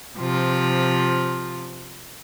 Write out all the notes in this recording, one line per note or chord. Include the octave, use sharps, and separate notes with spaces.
C3 F3 F4